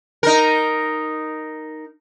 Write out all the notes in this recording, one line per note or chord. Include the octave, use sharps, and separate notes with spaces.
D#4 A#4